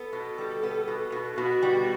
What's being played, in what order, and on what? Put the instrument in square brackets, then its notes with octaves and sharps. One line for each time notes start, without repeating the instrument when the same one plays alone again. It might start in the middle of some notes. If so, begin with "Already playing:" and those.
Already playing: [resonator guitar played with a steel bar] B3 [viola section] A4
[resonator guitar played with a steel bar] B2
G3
B3
B2
B2
[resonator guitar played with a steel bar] B2 [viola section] F#4
[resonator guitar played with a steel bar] G3